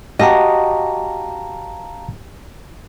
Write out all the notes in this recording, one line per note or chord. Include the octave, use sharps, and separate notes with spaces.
F#4 G4 D#5 F5 A5 A#5